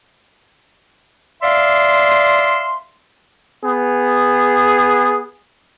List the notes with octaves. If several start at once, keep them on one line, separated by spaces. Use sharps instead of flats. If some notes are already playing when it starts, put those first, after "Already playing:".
D5 E5 F5 C6
B3 G#4